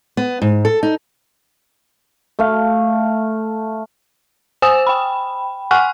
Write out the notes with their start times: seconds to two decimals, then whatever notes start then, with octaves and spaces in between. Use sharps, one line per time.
0.17 B3
0.42 G#2
0.65 A4
0.83 D#4
2.39 A3 F5
4.62 C5 G#5 D#6 E6 E7
4.87 G5 B5
5.71 F#5 G#5 C#6 F6 F#6